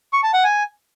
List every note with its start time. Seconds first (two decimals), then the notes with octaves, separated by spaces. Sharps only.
0.13 C#6
0.23 A5
0.34 F#5
0.44 G#5